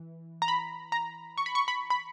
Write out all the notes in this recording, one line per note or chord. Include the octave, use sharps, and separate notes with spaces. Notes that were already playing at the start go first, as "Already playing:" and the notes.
Already playing: E3
A#5
B5
A#5
C#6
B5
C#6
B5
B5